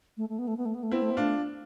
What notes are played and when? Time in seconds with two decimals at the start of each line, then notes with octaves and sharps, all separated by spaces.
0.17 A3
0.29 A3
0.39 B3
0.48 A3
0.57 B3
0.65 A3
0.74 B3
0.83 A3
0.91 B3 C4 E4
1.02 A3
1.11 B3
1.17 A3 D4 F4